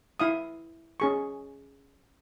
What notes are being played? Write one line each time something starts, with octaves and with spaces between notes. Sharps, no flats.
E4 F5 D#6
C#4 G#4 C#6